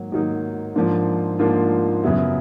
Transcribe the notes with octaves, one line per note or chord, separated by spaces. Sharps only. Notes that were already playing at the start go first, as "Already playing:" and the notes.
Already playing: G#2 D#3 F#3 A#3
G#2 D#3 F#3 A#3 D#4
G#2 F3 A#3 D4 F4
G#2 F3 A#3 D4 F4
F#2 C#3 F#3 B3 E4